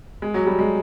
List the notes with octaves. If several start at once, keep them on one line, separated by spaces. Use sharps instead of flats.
G#3
F#3
G3
G#3